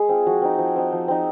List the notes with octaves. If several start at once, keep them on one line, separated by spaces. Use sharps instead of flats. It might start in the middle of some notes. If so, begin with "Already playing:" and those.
Already playing: G#3 G#4
C4 F4
F3 F#4
C4 D#4
F3
C4 D#4
F3
C4 D#4